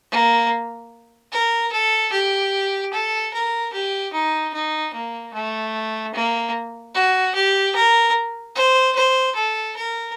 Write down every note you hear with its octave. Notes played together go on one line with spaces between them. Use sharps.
A#3
A#4
A4
G4
A4
A#4
G4
D#4
D#4
A#3
A3
A#3
F#4
G4
A#4
C5
C5
A4
A#4